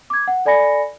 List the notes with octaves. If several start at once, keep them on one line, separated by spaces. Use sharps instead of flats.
D6 G#6
F#5
A4 D5 G#5 B5 A#6 C#7